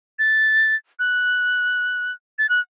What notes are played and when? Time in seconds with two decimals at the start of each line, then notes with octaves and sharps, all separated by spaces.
0.19 A6
0.99 F#6
2.39 A6
2.49 F#6